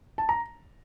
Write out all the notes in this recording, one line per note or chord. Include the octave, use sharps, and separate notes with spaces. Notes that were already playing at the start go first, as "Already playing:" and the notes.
A5
A#5